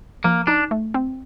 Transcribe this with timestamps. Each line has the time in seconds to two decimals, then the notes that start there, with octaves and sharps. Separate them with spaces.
0.24 F3 A#3
0.47 D4 D#4
0.71 A3
0.94 C4